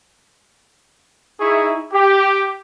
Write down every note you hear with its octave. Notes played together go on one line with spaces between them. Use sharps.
D#4 E4 G#4 E5 C#6
G4